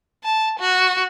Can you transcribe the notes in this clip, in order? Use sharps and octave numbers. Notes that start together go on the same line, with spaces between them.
A5
F#4